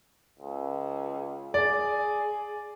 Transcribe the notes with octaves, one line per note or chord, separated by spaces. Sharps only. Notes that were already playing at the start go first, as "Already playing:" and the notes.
C#2
G#4 D5